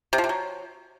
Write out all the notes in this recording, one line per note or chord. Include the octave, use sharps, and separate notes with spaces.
C3
F3
C3
F#3